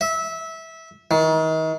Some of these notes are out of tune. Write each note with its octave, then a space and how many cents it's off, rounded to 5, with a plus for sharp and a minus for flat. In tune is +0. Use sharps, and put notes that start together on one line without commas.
E5 -20
D#3 +35